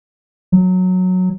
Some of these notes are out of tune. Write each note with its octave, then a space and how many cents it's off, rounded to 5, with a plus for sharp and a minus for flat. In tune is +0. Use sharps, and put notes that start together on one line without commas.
F#3 -10